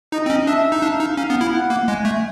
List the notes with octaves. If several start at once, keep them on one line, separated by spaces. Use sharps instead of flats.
D#4 D#5
C4
C#4
D4 E5
D#4
D4 F5
D#4
C#4 F5
B3
E4
F#5
A#3
G#3 G#5
A3